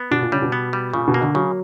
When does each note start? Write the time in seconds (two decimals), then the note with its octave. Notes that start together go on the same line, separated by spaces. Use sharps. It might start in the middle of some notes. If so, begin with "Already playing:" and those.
Already playing: B3
0.11 B2 D4
0.22 A#2
0.32 C#3 G3
0.42 B2
0.52 B3
0.73 G3
0.93 A#2 C#3
1.08 B2
1.14 A#3
1.21 D3
1.34 C#3 F#3